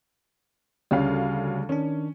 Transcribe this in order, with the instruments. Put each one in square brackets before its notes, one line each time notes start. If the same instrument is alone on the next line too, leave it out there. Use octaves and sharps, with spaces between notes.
[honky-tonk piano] D2 C#4 F5 [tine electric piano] C#3 G3
[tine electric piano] D#3 D4 [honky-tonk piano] C#4